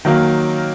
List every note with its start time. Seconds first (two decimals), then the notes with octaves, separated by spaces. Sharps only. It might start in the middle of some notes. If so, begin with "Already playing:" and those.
0.05 D#3 F#3 A#3